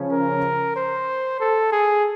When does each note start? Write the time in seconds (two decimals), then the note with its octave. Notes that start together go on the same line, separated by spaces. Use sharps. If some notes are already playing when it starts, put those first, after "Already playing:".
Already playing: C#3 F3 C#4
0.12 A#4
0.76 C5
1.40 A4
1.72 G#4